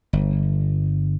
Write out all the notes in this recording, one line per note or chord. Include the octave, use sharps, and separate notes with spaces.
G1